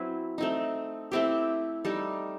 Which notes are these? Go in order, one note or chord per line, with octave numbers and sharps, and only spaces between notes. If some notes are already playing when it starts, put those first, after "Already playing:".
Already playing: F#3 C4 E4 B4
A3 C4 D#4
A3 C4 E4 G4
G3 D#4 A4